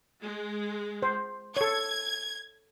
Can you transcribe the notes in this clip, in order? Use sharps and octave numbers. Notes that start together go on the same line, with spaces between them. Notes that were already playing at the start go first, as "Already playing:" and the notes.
G#3
C5
A4 C#5 G#6